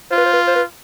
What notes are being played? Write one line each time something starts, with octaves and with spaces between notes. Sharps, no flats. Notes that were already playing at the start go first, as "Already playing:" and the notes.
F4 C5
B4
C5
B4
C5
B4